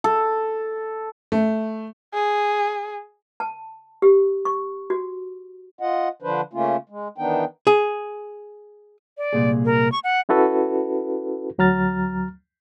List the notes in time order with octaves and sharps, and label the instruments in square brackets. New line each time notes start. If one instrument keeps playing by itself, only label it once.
[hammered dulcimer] A4
[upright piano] A3
[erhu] G#4
[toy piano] A5
G4
C#6
F#4
[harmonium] F4 D#5 F#5
D3 F3 D4 B4 C5
C#3 A3 A#3 C#4 F4
G#3
D#3 E3 B3 D4 D#4 G5
[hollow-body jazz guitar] G#4
[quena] D5
[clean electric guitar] C2 A#2 G#4
[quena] A#4
C#6
F#5
[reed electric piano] C#4 E4 F#4 A4 B4
D2 F#3 A#5 F6 A6